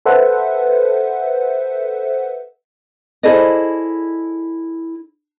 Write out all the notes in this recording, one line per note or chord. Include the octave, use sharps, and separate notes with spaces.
A4 B4 C5 E5 F#5
E4 G#4 A4 C5 D5 D#5